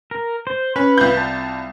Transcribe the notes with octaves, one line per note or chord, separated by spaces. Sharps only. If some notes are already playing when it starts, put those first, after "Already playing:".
A#4
C5
C#4 B4
C2 F4 G6
A5